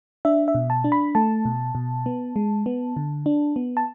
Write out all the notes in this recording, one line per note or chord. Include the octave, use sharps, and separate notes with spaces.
D4 E5
E5
B2
A5
D4
B5
A3 A5
B2
B2
B3
G#3
B3
D3
D4
B3
A5